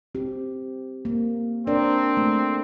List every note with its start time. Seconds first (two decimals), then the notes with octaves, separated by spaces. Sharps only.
0.15 C4 G4
1.05 A#3
1.67 C4 D4 A#4 D5
2.17 A3